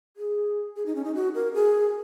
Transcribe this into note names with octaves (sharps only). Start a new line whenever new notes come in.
G#4
G#4
D#4
C#4
D#4
F#4
A#4
G#4